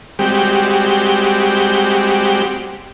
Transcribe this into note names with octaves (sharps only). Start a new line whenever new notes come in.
G3 G#3 C4 F#4 G4